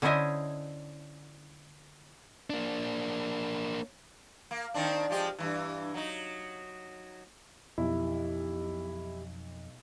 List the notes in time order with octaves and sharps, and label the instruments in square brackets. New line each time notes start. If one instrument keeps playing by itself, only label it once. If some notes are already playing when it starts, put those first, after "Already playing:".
[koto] D3 C#4 E4 C5 D#5 G#5
[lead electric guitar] A#3 D4
[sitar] A#3
D#3 C4 D4
F3 G#3 G4
G2 A#2 E3
F#3 D#4
[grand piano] B1 [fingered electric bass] F2 [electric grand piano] E4 [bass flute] G4